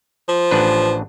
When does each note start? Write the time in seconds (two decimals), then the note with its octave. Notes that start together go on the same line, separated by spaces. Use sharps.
0.29 F3
0.51 A1 D4 B4